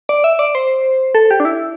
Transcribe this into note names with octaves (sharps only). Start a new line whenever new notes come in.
D5
E5
D5
C5
A4
G4
D4
E4